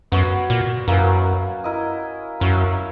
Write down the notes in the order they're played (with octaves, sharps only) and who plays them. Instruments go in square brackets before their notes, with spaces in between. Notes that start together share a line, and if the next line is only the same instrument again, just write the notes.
[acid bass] F#2 [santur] B3 F#4 C#5
[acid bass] A#2
[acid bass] F#2 [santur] A#3 C#4 E4 B4
[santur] E4 A#4 D#5
[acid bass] F#2 [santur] E4 A#4 C#5 E5